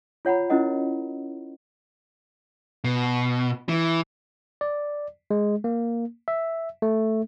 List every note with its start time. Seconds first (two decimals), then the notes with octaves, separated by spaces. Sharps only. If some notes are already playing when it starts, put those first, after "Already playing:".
0.25 F4 C#5 F#5 A#5 B5
0.50 C#4 E4 A#4 D#5 F#5
2.84 B2
3.69 E3
4.61 D5
5.31 G#3
5.64 A#3
6.28 E5
6.82 A3